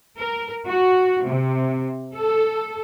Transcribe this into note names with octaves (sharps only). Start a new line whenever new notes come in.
A#4
F#4
C3
A4